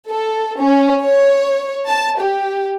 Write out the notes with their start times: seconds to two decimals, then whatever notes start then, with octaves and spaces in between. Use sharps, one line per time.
0.11 A4
0.60 C#4
1.05 C#5
1.88 A5
2.19 G4